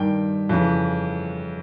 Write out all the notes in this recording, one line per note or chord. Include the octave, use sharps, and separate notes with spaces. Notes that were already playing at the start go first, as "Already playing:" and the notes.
Already playing: G2 D#3 G5
F2 C#3 E3